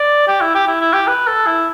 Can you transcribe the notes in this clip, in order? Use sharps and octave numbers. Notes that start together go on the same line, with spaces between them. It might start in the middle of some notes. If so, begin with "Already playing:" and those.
Already playing: D5
G4
E4
G4
E4
E4
G4
B4
A4
E4